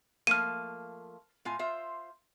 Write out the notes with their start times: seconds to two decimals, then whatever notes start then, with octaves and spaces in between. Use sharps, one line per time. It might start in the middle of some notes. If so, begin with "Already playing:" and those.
0.27 F3 A3 A#3 F6 D#7
1.45 A2 F4 G#5
1.59 F4 C5 E5